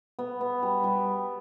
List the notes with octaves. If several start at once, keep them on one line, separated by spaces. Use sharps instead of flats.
B3
B3
G3
G3